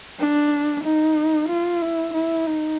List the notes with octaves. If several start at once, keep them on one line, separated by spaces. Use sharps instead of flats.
D4
D#4
F4
E4
E4
D#4